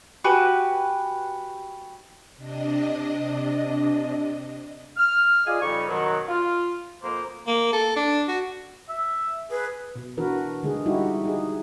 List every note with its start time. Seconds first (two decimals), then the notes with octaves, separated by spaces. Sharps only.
0.24 F#4 G4 B4 G#5
2.37 C3 D4 D#5
4.97 F6
5.46 F4 G#4 D5 D#5 G#5
5.61 F2 C#3 G3 D#4 C#6
5.88 F#2 B2 D#3 F#3
6.28 F4
7.02 F2 B2 A#3 C5
7.47 A#3
7.73 A4
7.96 D4
8.28 F#4
8.89 E5
9.51 G#4 B4
9.96 B2
10.17 E3 D4 F#4 A#4 B4
10.63 D3 G#3 G#4
10.86 G3 D#4 E4 F#4 G4
11.24 D#4 E4 G#4